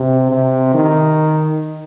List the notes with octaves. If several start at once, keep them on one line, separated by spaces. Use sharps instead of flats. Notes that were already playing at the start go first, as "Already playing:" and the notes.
Already playing: C3
C3
D#3